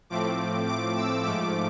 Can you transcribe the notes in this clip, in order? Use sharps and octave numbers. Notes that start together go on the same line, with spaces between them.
A2 F3 A3 C4 D6
D6
E6
G#2 F3 A3 D6